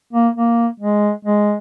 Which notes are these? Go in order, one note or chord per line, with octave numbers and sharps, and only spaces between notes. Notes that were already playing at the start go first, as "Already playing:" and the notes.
A#3
A#3
G#3
G#3